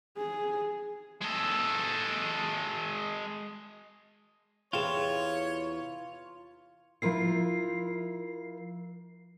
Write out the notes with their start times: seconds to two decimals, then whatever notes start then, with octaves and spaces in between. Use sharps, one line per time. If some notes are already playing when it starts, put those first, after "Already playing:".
0.18 G#4
1.22 G#3 A4
4.73 E2 C3 E3 F4 G#4 C#5 G5
7.02 F3 E4 F4 A#4 C7